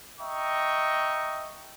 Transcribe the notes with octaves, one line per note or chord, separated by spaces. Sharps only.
D#5 E5 G5 A#5 C#6